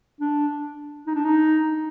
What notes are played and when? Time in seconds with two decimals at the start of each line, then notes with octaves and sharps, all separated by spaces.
0.21 D4
1.07 D#4
1.15 D4
1.25 D#4